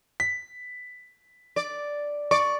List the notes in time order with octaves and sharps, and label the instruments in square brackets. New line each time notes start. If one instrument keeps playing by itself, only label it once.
[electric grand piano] B6
[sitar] D5
[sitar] D5 [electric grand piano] C#6